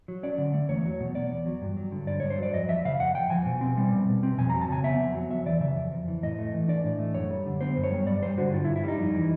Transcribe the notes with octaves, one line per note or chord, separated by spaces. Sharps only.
F#3
C#4 D5
D3
A3
E2 C#5
F#3
B2
B3 D5
E2
F#3
G2
F#3
D3
G2 D5
G2 C#5
C5
F#3 D5
F2 D#5
F3 E5
C#3 F5
F2 F#5
F2 G5
F3 G#5
B2
C4
G3
B2
B2
C4
F2 G#5
A#5
F#3
A5
C#3 G#5
B3 E5
F2
F#3
F2 E5
E3 D5
C#3 E5
F2
F2
E3
A2 D#5
A3
E3
D4 D5
A2
A3
F#2 C#5
G3
D3
B3 C5
F#2
C#5
G3
G2 D5
G3 C5
D3 F#4
G2 F4
E4
G2
E4
G3 D#4
F2
E3